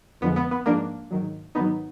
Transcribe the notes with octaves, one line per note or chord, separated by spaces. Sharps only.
F2 D3 F3 G#3 B3
B3
B3
G#2 F3 G#3 A#3 D4
G#2 D#3 F#3
G#2 D#3 F#3 B3 D#4